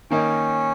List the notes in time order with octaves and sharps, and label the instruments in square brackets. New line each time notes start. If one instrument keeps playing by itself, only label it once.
[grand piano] D#3 A#3 D#4 [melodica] C#4